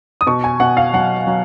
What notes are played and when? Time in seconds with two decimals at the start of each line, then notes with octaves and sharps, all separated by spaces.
0.21 D#6
0.27 B2 C#6
0.44 G#5
0.60 B2 F#5
0.77 F5
0.93 F#3 F#5
1.27 F#3